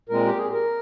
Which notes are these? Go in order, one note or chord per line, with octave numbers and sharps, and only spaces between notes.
A#2 G#3 C4 A#4
G4
G#4
A#4